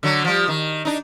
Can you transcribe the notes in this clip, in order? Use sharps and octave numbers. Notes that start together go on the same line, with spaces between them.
D3 F#3
F3 G3
D#3
D4 D#4